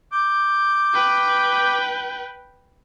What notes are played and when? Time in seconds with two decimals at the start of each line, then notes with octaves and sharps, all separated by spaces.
0.12 D6 G6
0.94 B4 G5